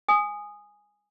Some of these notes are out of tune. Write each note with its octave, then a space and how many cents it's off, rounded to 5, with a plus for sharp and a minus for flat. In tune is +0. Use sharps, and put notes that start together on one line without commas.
G#5 +0 D#6 -10